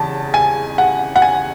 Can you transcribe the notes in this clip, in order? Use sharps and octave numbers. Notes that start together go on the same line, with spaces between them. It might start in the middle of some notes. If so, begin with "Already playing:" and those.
Already playing: E2 C#3 A5
G#5
F#5
F#5
G#5